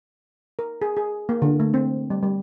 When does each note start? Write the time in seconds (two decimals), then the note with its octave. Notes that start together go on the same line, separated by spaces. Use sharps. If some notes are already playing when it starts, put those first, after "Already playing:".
0.59 A#4
0.82 G#4
0.97 G#4
1.29 A#3
1.42 D3
1.60 A3
1.74 C4
2.10 G3
2.23 G3